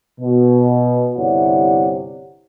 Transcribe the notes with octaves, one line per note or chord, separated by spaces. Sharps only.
B2
G1 C3 E4 C#5 D5 F#5